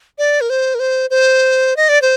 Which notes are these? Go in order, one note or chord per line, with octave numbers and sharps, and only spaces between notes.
D5
A#4
C5
A#4
C5
C5
D#5
D5
C5